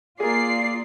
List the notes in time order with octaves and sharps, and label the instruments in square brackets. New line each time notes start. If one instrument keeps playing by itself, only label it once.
[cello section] A#3 F4 [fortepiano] G#4 A#4 [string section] D5 C7